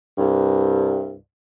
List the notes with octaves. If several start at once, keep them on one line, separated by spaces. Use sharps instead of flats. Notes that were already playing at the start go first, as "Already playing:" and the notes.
C2 G2